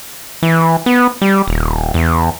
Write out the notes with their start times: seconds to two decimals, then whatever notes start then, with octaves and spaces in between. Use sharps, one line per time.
0.43 E3
0.86 B3
1.22 G3
1.48 D#1
1.94 E2